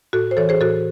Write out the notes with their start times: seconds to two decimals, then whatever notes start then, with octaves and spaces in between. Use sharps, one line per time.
0.13 A2 F#4 A4
0.31 C5
0.37 E3 A4 C#5
0.49 G#4 C5
0.60 A2 F#4 A4